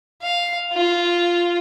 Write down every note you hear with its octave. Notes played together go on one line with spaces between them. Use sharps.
F5
F4